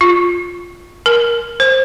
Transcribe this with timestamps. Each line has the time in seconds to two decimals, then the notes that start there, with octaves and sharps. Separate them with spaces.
0.01 F4
1.06 A#4
1.60 C5